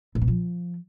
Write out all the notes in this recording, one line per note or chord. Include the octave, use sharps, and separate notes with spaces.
A2
B2
F3